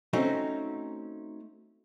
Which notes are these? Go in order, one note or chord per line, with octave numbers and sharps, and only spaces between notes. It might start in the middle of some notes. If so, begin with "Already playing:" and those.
A3 C4 C#4 D#4 F#4